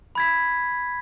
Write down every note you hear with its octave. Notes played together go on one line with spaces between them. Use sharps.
B5 G#6 B6